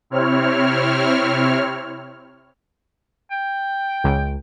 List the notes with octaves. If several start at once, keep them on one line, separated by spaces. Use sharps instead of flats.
C3 C4 E4 C#5 F6
G5
C#2